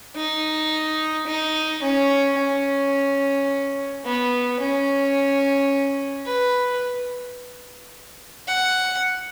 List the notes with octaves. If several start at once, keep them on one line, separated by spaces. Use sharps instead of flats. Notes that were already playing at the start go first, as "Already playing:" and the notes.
D#4
D#4
C#4
C#4
B3
C#4
B4
F#5